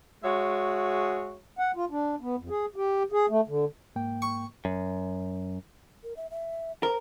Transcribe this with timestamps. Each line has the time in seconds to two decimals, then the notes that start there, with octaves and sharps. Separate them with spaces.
0.23 G#3 F#4 G#4 C#5 E5
1.59 F#5
1.76 F4
1.91 D4
2.21 B3
2.38 F2
2.50 G#4
2.76 G4
3.12 G#4
3.29 A3
3.48 D3
3.96 G#2 A#3 G5
4.22 C#6
4.65 F#2
6.03 A#4
6.17 E5
6.31 E5
6.83 A#4 C5